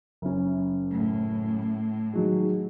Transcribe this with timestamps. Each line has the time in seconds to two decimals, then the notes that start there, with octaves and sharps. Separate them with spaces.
0.22 F#1 C#4
0.90 A2
2.13 D#3 F#3 G#3